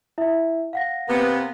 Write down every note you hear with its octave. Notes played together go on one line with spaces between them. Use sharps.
E4 E5
F5 F#5 A#6
C3 A#3 B3